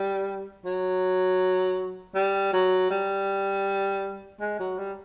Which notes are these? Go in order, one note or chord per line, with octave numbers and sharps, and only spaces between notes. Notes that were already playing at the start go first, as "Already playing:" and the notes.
Already playing: G3
F#3
G3
F#3
G3
G#3
F#3
G3